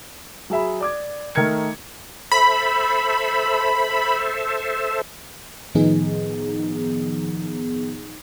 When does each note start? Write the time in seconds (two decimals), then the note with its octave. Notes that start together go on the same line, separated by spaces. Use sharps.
0.50 F#3 G#4 E5 B5
0.81 D5 D6 G#6
1.35 D#3 A3 A#4 G#6 C#7
2.32 A4 C5 E5 B5
5.75 A2 D#3 F3 B3 D#4 G#4